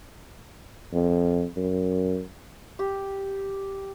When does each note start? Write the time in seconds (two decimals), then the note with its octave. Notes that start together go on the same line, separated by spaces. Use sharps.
0.93 F2
1.57 F#2
2.79 G4